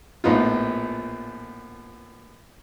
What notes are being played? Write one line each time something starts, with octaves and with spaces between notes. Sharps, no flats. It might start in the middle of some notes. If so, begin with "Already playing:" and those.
A#1 A2 B3 D#4 F4